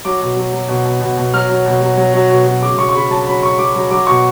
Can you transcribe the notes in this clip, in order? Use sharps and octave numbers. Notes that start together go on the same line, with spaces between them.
F#3 D6
B2
F#3
F#3
B2
B2
B2
B2
F#3 F6
F#3
B2
F#3
F#3
F#3
B2
F#3
C#3 D6
F#3 C#6
C#6
C#3 B5
F#3 A5
F#3 B5
F#3 C#6
F#3 D6
F#3
F#3 D6
B2 C#6